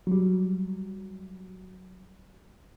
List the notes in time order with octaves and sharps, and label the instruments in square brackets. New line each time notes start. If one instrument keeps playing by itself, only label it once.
[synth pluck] F#3 G3